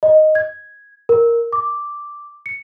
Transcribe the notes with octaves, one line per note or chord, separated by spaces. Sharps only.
D#5
G#6
A#4
D6
C#7